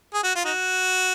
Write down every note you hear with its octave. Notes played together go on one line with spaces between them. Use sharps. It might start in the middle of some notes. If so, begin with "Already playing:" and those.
G#4
F#4
F4
D#4 F#4